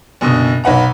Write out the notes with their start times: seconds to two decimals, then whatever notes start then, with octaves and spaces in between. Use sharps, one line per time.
0.21 F#1 B2 D3 D#6
0.64 B1 B4 F#5 A#5